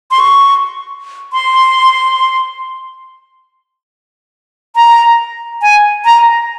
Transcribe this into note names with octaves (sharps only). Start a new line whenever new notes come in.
C6
C#6
C6
A#5
G#5
A#5